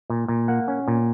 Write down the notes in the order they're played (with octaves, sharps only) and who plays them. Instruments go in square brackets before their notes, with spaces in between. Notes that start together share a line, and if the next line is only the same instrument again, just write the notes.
[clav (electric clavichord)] A#2
A#2
A#3 F#5
C#4
A#2